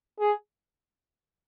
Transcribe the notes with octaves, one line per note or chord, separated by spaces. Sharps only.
G#4